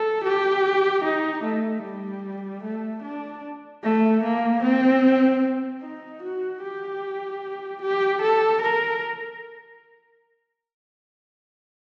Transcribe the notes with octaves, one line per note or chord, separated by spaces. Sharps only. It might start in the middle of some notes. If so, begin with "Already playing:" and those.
Already playing: A4
G4
D#4
A3
G3
A3
D4
A3
A#3
C4
D#4
F#4
G4
G4
A4
A#4